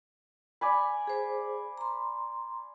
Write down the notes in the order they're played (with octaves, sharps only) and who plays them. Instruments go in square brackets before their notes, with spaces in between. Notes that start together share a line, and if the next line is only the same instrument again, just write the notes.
[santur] D5 G#5 B5
[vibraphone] G#4 C5
A#5 C6